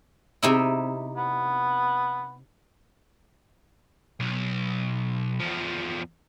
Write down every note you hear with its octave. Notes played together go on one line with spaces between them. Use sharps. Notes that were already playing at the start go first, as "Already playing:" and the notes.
C3 D#4 E4
B3
B1
E2 F3